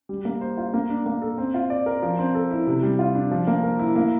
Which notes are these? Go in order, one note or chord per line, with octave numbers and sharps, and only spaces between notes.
G3
A#3
C5
F4
A#3
D4
A#3
A4
C4
F4
D5
A#4
F3
C4
A4
E4
C3
G3
F4
D4
F3
A#3
A#4
E4
A#3